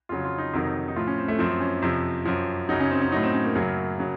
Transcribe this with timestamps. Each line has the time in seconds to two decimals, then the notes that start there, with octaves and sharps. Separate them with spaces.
0.09 F2 C#3 F#3 F4
0.25 F4
0.38 D#4
0.54 F2 C3 D#3 F#3
0.88 D#4
0.96 A2 F3 F4
1.07 C#4
1.18 C4
1.28 A3
1.39 F#2 F3 C4
1.60 C#4
1.82 F2 C3 F3
2.25 F#2 F3
2.69 F#2 C#3 F#3 D#4
2.80 C#4
2.91 C4
3.01 C#4
3.12 A2 F#3 D#4
3.23 C4
3.34 C#4
3.44 A#3
3.55 F#2 C#3 F#3
3.99 C#3 F#3